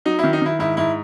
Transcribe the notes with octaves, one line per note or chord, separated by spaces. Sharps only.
F#3 D#4
E4
D#3
D#4
D#3 E4
G#2 E4
G#2 E4